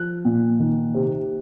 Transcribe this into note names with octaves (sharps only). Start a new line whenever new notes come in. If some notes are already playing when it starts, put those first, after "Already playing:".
Already playing: F3 F#6
A#2
D#3
C3